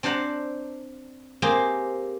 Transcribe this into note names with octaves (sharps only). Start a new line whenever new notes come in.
C4 D4 C5 F#5 A#5
A#3 C4 G4 G#4